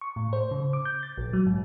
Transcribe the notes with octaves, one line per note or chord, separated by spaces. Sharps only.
C#6
A2
C5
C#3
D6
G6
A6
A#1
F#3
G#2